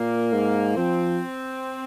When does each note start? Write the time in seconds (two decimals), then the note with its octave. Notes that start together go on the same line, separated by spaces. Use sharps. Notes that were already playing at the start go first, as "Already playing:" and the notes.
Already playing: A#2 A#3
0.33 G#2
0.76 F3 C4